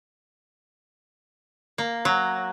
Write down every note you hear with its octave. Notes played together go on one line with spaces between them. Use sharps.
A#3
F#3